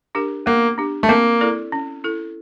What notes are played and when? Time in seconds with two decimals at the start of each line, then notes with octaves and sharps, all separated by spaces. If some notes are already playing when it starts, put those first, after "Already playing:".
0.15 D4 G4 A#4
0.46 A#3 B3
0.78 D4 G4
1.03 A3
1.09 A#3 C4
1.41 E4 A4 D5
1.72 C#4
2.04 E4 A4